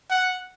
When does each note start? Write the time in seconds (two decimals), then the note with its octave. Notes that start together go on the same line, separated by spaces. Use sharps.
0.10 F#5